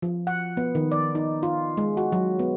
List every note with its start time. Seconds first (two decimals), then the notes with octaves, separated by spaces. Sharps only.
0.02 F3
0.27 F#5
0.57 B3
0.75 D#3
0.92 D5
1.15 D#4
1.43 F4
1.77 G#3
1.97 F#4
2.12 F#3
2.39 B3